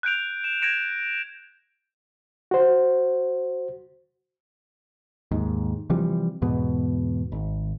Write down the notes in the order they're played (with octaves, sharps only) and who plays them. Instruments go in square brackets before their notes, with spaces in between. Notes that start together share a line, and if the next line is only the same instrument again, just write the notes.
[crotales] F#6 G6 D7 F7
E7
G#6 A#6 D7 E7
[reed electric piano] F#4 C5
[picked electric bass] D#2 G#2
C3 E3 F3 G3
E2 G#2 B2 B3
G#1